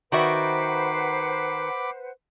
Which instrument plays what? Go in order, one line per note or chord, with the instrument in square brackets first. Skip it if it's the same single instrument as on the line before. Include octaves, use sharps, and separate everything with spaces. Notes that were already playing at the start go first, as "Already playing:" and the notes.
[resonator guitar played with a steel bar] D#3 F#4 E5 [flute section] B4 C5 F#5 [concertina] B5 D6